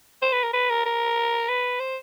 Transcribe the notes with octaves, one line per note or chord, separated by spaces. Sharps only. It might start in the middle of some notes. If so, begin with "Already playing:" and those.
C5
B4
A#4
B4
A#4
A#4
B4
C5